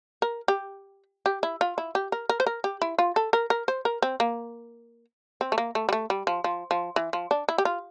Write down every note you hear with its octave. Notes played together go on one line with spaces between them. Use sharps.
A#4
G4
G4
E4
F4
E4
G4
A#4
A#4
C5
A#4
G4
E4
F4
A4
A#4
A#4
C5
A#4
C4
A#3
C4
A3
A#3
A3
G3
A3
G3
F3
F3
F3
E3
F3
D4
E4
G4
F4